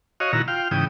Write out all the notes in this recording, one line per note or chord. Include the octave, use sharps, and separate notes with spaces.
F#4 C#5 D#5 F5
A#2 D#3 E4 F#4 A#5
F4 F5 G5
G#2 C#3 E3 G5 D#6